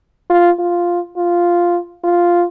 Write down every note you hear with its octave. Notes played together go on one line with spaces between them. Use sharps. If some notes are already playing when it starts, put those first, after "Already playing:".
F4
F4
F4
F4